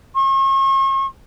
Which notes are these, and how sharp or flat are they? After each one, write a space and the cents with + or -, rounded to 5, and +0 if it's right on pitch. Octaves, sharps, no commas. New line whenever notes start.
C#6 -40